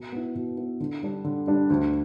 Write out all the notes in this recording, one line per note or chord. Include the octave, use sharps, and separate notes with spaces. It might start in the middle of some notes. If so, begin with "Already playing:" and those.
Already playing: B2
B3 E4
B2
B3 E4
D3
G3 D4
D3
G3 D4
D2